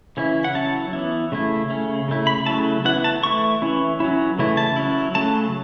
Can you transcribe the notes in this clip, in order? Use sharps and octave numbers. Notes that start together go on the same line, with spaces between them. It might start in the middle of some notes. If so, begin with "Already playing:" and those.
C#3 E3 C#4 E4
F#5
F#3 C#4 E4 A5
E3 B3 E4
C#3 A3 E4
C#3 A3 C#4
C#3 A3 E4
B5
C#3 F#3 A3 C#4 E4 A5
E3 B3 E4 F#5
A5
E3 A3 E4 C#6
E3 C#4 E4
F#3 C#4 E4
C#3 E3 A3 E4
A5
F#3 C#4 E4
C#3 F#3 A3 A5